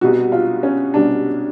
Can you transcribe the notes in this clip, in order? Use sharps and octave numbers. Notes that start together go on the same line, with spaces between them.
C2 B2 G3 F#4
F4
C#4
C2 B2 G3 D4